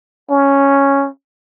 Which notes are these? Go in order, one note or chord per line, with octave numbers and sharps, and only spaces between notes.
C#4